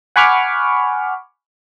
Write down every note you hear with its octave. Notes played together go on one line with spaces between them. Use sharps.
F#5 G#5 B5 C#6 D6 F6